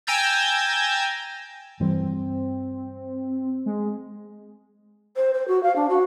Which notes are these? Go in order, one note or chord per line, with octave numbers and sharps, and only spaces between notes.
G5 G#5 A#5 E6 G6 A6
G2 E3 G3 C4
G#3
C5
C5
F#4
F5
D4
F#4